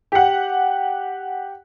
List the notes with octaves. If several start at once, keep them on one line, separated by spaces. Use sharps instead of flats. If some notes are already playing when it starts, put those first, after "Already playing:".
G4 F#5